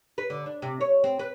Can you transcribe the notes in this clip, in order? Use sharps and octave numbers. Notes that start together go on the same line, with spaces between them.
B4
D3
D4
C3
C#5
C4
B4